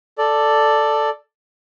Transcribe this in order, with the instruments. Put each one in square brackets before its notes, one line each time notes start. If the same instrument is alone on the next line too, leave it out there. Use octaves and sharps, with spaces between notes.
[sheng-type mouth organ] A4 D5